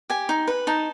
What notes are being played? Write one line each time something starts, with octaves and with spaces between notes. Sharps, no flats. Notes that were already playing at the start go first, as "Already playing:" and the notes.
G4 G#5
D#4
B4
D#4 A5